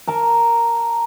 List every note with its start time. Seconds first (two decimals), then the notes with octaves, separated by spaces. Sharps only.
0.07 A#4 A5 A#5